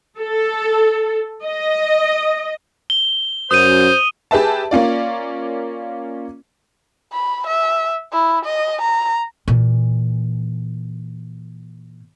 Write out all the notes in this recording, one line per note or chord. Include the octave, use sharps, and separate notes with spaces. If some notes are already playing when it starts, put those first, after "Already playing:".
A4
D#5
G7
F#2 C5 D#6 D#7
G4 G#4 B4 E5 A5
A#3 C#4 F4 D5
B5
E5
E4
D#5
A#5
A#2 E3